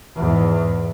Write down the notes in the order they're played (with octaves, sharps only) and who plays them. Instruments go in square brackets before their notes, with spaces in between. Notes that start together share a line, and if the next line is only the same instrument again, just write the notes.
[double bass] E2 G#2